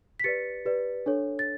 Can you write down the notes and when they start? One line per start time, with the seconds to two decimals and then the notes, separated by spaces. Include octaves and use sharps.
0.20 B6
0.24 G4 B4 D5 A6 C#7
0.65 G4 B4 D5
1.06 D4 A4 C#5
1.39 A6